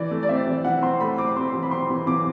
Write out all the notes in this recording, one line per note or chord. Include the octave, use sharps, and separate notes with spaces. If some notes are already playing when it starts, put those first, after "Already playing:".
Already playing: E3 D5
A3
D5
C4 E5
E3
E3 F#5
C4 C6
A3 B5
C4 D6
C4 C6
E3
B5
C4 C6
E3
E3 D6